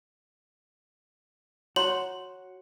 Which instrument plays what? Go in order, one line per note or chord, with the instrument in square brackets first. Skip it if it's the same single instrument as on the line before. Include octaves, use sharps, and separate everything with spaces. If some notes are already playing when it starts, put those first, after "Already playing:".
[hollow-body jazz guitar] F#4 [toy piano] C#5 A#5 C6 [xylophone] F#7